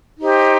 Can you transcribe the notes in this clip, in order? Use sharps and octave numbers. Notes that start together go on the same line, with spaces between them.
D#4 G4 C5